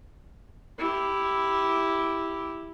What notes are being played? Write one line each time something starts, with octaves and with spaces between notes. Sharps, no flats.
E4 G4